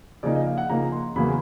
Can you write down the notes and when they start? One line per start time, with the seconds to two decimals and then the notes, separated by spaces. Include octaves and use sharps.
0.23 C#3 F3 A#3 D#4 D5
0.35 D#5
0.47 F5
0.58 F#5
0.69 C#3 F3 A#3 D#4 A#5
0.92 C6
1.16 E2 C#3 F#3 A#3 B5